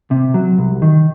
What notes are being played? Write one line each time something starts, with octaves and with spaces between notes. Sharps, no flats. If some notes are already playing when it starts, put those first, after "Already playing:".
C3
F#3
C2
D#3